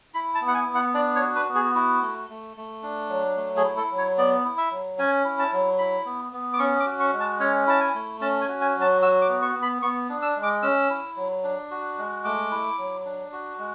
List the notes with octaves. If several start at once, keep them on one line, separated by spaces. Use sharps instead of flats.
E4 B5
A5
B3
F#5
G#5
B3
F#5
D4 D5
C#5
F#4
B4
B3
G#4
E4 F#4
A3
A3
A3
D4
F#3
A3
G#4
E4
A4
F#3
C#5
B3 D5
E4
E5
F#3
C#4 G#5
E4
A5
F#3
E4 B5
B3
B3
D6
C#4 C#6
D6
F#4
C#6
G#3
A5
C#4 C#5
E4 A5
G#5
A3
C#4 A5
G#5
F#4
G#5
F#3
A5
F#4 E6
D6
B3
C#6
B3
B5
B3 C#6
D4
E6
G#3
D6
C#4 E6
E4
F#3
D4
F#4
G#3
A3 D6
E4
F#3
D4
F#4
G#3